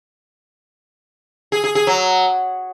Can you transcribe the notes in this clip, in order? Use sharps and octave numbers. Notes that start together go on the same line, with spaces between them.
G#4
G#4
G#4
F#3